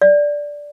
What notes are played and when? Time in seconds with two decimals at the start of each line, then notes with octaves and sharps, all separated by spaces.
0.02 D5